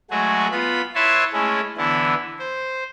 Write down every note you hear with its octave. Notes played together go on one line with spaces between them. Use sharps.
F#3 G#3 A3 F#4 G#4
B3 F4 B5
E4 B4 C#5 E5 A5 C6
G#3 A3 C#4 E4
D3 E3 B3 E4
C5